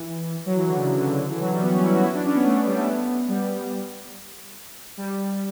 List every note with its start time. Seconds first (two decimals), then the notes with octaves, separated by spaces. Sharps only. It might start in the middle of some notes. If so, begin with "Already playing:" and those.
Already playing: E3
0.46 F#3
0.56 E3
0.67 D3
0.77 C#3
0.98 D3
1.19 D3
1.30 E3
1.40 F#3
1.50 G3
1.61 B3
1.71 C#4
1.82 E4
1.93 F#4
2.04 E4
2.14 D4
2.24 C#4
2.35 B3
2.45 A3
2.56 A3
2.66 G3
2.76 A3
2.87 B3
3.29 G3
4.97 G3